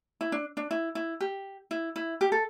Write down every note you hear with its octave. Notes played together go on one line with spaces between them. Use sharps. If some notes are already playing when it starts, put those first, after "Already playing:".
E4
D4
D4
E4
E4
G4
E4
E4
G4
A4